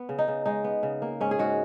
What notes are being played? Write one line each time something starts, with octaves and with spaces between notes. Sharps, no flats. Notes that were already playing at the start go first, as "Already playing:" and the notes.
Already playing: B3
C#3
D#4
C#3
G#3 D#4
B3
C#3
A#3
G#2 C#4
G#4
G#2 F#4